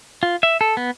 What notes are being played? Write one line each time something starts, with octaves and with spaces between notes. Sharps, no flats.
F4
E5
A4
B3